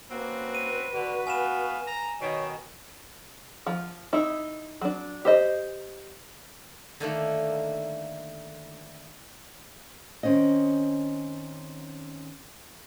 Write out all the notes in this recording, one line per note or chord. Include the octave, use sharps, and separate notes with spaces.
A#3 C4 C#4 F#4 B4
D#7
D3 F#4
B3 F5 G#5 E7
A#5
B2 D#3 C#5
F3
D#4 E4
F#3 D4
G4 C5 D#5
D3 D#3 A3 A#3
D#3 C4 C#4 C5 D#5